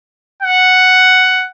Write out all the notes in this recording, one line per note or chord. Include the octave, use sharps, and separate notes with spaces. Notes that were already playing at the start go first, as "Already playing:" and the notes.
F#5